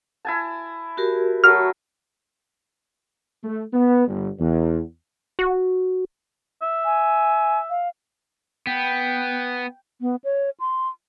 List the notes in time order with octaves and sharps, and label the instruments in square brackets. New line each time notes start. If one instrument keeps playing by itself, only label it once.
[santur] E4 G#5 A5
[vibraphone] F#4 G4 A#4
[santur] F#3 A3 [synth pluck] F6
[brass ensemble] A3
B3
G1
E2
[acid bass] F#4
[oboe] E5
[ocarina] G#5
F5
[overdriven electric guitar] B3 [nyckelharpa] G5
[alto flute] B3
C#5
C6